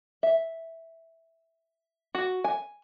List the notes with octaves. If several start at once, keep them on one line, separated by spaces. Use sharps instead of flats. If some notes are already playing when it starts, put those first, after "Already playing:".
E5
F#4
G#5